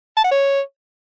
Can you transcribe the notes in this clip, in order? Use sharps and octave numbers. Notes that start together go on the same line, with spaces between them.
A5
F#5
C#5